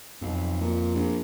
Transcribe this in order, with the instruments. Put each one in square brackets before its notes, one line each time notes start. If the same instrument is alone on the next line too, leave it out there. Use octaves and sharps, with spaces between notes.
[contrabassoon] B1 [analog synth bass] F2
[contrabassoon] A#2
A#1